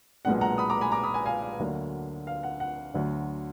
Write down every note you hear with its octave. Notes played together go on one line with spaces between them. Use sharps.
B1 A#2 G#3 B3 D4 F#5
F#5 A#5
B5 D#6
A#5 D6
G#5 B5
A#5 D6
B5 D#6
G#5 B5
F5 G#5
F5
D2 D3 F#3 A#3 D4
F5
F#5
F#5
D2 D3 F#3 D4